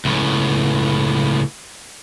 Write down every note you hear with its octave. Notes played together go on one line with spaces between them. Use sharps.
C#2 A2